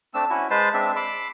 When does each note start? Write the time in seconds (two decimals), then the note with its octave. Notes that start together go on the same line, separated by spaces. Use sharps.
0.14 A3 C4 D4 E6
0.30 C#4 E4 F#4
0.50 G#3 B4 C5 A5
0.74 G#3 C4 D4 E5
0.96 B5 C6 D6 E6